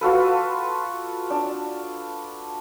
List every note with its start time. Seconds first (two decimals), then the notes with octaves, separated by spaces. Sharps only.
0.01 F4 F#4 A4 B4
1.30 D4